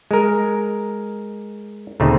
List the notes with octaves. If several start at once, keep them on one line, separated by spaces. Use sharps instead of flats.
G#3 A#4
D2 A#2 C#3 A3 C4 D#4